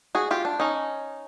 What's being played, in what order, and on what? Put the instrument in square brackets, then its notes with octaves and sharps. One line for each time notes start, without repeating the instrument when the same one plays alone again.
[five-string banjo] F#4 G#4
F4 G4
D4
C#4 D#4